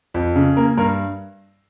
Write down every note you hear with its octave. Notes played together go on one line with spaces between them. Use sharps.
F2
C#3
A#3 A#4
G2 A#4